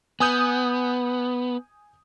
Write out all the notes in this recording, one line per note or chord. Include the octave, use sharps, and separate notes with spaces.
B3 G#5 D#6 G6